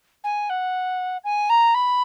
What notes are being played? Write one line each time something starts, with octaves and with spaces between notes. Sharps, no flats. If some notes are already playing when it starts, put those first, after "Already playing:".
G#5
F#5
G#5
A#5
B5